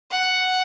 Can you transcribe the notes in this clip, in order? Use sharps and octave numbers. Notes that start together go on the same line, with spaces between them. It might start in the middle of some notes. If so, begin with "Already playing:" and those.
F#5